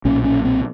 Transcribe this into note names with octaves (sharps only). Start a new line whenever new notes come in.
B1 A#2 C#4
C#4
C4